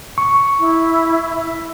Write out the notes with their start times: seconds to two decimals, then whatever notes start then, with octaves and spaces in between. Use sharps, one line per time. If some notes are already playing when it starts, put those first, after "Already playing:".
0.18 C#6
0.59 E4
1.36 E5